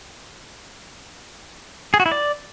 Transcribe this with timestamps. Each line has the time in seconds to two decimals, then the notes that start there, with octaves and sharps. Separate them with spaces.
1.94 G#4
2.00 F#4
2.06 E4
2.12 D5